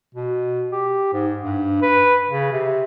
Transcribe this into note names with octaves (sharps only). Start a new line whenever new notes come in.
B2
G4
G#2
G2
B4
C#3
C3